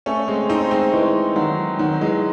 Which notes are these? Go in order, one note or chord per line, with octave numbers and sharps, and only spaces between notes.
A3 C#4
G#3 C4
C4 D#4
G#3 C4
E3 G#3
D#3 F#3
D#3 F#3
E3 G#3